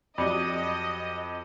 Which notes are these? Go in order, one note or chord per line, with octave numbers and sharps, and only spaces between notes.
F2 F#3 G4 D5 D#5 B5 D6 C#7